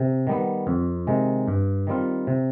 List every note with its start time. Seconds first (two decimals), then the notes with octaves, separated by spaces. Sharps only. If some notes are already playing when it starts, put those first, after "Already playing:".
Already playing: C3
0.27 D#3 G3 B3
0.67 F2
1.07 C3 D#3 G#3
1.48 G2
1.87 D#3 G3 C4 F4
2.27 C3